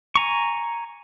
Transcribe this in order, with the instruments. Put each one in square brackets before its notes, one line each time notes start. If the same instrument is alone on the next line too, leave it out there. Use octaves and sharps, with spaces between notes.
[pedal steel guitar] G#5 A#5 C#6